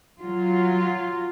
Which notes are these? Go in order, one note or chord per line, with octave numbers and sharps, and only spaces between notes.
F#3 F4